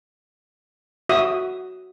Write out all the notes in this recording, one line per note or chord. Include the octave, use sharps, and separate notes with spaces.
F#4 E5 D#6